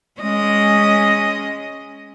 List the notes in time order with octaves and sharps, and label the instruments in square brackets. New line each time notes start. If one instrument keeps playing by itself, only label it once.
[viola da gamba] G#3 C#4 D#5